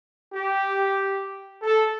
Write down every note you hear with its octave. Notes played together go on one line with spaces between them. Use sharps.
G4
A4